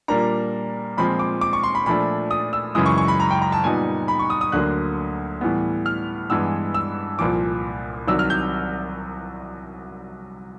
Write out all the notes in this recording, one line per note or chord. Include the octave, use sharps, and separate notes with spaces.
A#2 G3 A#3 D4 A#5
A#2 F3 G#3 C4 B5
D6
D6
C#6
C6
B5
A#2 F3 A3 D4 B5
D#6
E6
F#2 C#3 E3 G#3 D#6
C#6
C#6
B5
A#5
G5
A#5
A5
A#2 G3 B3 D#4 G#5
B5
C#6
D#6
D#6
D2 D3 F#3 A#3 F#6
A2 E3 G3 B3
F6
G2 E3 G#3 B3 E6
E6
C2 A#2 F3 D6
C2 C3 D#3 F#3 E6
F6
G6